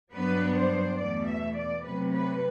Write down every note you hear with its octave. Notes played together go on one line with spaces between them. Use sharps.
G2 F#3 B3 D4 B4
C5
E2 B2 A3 D5
E5
D5
C3 F#3 A3 B4
B4